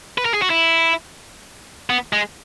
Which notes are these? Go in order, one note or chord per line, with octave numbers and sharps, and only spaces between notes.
B4
A#4
G#4
F#4
E4
B3
G#3